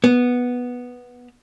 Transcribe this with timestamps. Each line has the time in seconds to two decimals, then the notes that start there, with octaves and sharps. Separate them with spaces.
0.04 B3